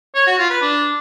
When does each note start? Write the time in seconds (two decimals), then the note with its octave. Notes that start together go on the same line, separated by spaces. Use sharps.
0.15 C#5
0.27 F#4
0.38 F4
0.50 B4
0.62 D4